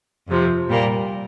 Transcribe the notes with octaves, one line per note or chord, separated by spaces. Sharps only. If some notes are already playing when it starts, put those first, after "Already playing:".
F2 C3 F3
A#2 G3 A#3